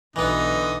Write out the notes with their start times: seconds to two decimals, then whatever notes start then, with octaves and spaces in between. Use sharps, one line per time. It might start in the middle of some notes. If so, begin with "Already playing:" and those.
0.16 B1 D3 E3 B3 D#4 D#5